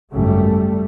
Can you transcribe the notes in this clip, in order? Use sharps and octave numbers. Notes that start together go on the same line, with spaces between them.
G#1 F#2 C#3 G3 A3